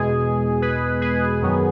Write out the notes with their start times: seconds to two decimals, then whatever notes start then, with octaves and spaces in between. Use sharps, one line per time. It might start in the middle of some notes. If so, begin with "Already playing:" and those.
Already playing: E2 B2 G#3 G#4
0.62 G#4 B4
1.02 G#4 B4
1.42 F#2 D#3 F#3 B3